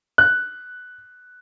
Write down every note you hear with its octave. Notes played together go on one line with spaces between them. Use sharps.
F#6